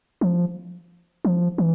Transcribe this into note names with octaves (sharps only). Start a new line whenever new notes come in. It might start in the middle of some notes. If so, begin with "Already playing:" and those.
F3
F3
E3